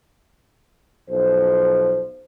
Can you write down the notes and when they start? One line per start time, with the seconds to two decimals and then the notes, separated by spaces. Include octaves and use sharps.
1.10 B1 F3 C5